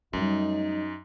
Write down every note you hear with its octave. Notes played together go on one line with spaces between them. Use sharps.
F#2 G3 A3 D#4